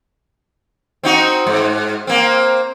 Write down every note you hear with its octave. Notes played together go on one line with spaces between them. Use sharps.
C4 D#4 F#4
G#2
A#3 C4